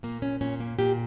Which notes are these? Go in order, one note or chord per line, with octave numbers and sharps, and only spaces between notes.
A#2 A#3
C#4
A#2 C#4
A#3
A#2 G4